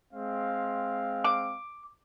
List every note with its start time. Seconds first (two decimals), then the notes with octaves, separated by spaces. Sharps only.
0.13 G#3 C4 F5
1.25 D6